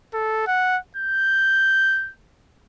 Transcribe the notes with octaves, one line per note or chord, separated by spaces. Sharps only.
A4
F#5
G6